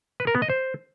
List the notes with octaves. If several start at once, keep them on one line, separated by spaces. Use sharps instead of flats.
B4
A#4
B3
D#5
C5